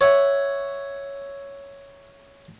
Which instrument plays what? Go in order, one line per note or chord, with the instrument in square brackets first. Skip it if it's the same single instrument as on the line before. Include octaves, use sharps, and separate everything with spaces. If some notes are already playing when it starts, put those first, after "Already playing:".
[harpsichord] C#5 E5 F#5